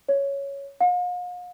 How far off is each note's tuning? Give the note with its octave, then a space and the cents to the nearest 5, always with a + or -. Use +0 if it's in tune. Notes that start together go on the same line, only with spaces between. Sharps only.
C#5 +5
F5 +45